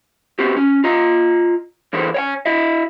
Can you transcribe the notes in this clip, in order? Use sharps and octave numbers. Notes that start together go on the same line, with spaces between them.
B3 C4 F#4 G4
C#4
F4 D#5 A#5
D3 E3 G#4 A4 B4 C5
C#5 G5 G#5
E4 D#5 E5